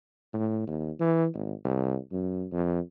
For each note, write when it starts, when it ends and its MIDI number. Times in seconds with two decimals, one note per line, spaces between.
0.34 0.66 45
0.67 0.91 39
1.00 1.27 52
1.34 1.53 32
1.65 1.97 36
2.12 2.46 42
2.52 2.80 41